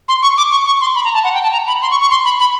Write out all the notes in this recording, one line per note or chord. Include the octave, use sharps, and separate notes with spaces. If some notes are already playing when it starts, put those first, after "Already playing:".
C6
C#6
D6
C#6
C#6
C6
B5
A#5
A5
F#5
G5
A5
A#5
B5
C6
C#6
C#6
C6
B5
B5